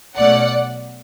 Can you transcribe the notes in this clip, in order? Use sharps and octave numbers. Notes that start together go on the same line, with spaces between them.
B1 B2 A3 C#4 D5 F#5